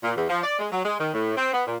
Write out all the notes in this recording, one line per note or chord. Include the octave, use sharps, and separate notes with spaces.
A#2
E2
F3
D5
G#3
F#3
G#3
D#3
A2
C4
B3
A#2